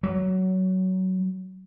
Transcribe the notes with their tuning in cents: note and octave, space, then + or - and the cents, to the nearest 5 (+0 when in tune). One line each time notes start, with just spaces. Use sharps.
F#3 +15